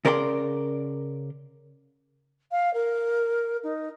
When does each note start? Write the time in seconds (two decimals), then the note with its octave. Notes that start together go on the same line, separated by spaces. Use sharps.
0.05 C#3 A#4 D5 F#5 C6
2.51 F5
2.73 A#4
3.63 D#4